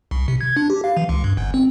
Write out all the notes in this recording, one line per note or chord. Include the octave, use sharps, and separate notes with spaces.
C2
C3
G#6
D4
G4
F5
E3
C#2
G2
G1
C4